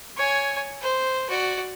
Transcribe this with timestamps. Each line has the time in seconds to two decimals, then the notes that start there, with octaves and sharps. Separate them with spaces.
0.17 C#5 G#5
0.81 C5
1.29 F#4 D5